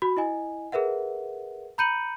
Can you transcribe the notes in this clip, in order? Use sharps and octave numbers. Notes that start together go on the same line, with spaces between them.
F#4 B5
E4 D#5 G#5
G#4 A#4 B4 E5 F#5
A#5 B5 G6 C#7 D#7 F#7